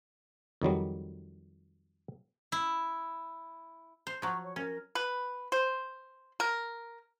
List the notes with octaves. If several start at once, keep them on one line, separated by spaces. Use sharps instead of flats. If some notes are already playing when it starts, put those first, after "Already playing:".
F2 D#3 F#3 G3
E4
C5
F3 F#3 C#6
C#5
C#4 A#4
B4
C5
A#4